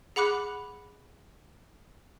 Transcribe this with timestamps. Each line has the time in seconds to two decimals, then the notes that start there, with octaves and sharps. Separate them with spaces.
0.16 G#4 F#5 B5 D6 F#6